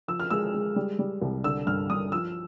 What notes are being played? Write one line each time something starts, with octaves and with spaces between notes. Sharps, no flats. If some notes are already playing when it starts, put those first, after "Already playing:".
F3 E6
F6
G#3 E6
G#3
G3
G3
C2
D3 E6
G2 F6
G2 D#6
F3 E6